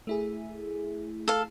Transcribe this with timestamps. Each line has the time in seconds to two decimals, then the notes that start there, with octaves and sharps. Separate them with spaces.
0.07 A3 E4 G#4
1.28 A4 F5